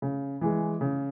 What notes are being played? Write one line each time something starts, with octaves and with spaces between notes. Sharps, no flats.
C#3
E3 G#3
C#3